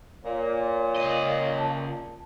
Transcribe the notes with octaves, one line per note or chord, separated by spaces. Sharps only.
A#2 C#5
C#2 D#5
A5